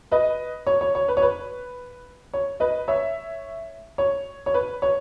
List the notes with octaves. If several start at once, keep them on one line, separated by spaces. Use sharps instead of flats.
B4 D#5
C#5
C#5
C#5
B4
C#5
B4
C#5
B4 D#5
C#5 E5
C#5
C#5
B4
C#5